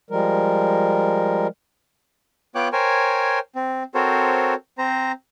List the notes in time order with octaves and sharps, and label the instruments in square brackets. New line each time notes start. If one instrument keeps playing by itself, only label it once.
[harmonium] F3 G3 G#3 A#4
[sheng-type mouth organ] B3 F4 C#5 G5 D6 F#6
A#4 C5 C#5 G5 G#5
C4
C4 F#4 A4 A#4 C5 C#5
C4 C5 A#5